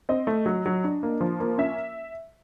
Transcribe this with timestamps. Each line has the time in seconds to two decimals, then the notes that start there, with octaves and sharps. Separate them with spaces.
0.09 C4 D#5
0.27 A3
0.46 F#3
0.66 F#3
0.84 D4
1.03 A#3
1.21 F3
1.40 A#3
1.58 C#4 E5